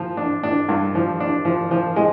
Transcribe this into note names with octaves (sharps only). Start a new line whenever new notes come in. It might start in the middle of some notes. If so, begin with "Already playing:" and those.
Already playing: F3
D4
D4
G2
F3
D4
F3
F3
G#3